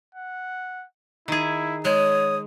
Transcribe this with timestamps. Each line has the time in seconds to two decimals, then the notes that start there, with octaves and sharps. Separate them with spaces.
0.15 F#5
1.28 D#3 E4 G#4
1.85 G#3 C#5 D#6